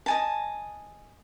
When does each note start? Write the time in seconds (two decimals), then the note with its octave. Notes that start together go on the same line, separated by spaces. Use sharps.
0.06 D#5 G#5 A5